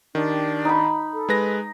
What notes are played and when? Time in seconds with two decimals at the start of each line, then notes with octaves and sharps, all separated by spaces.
0.15 D#3 D4 G4
0.65 D#4 B5
1.13 A4
1.29 G#3 B4 A#6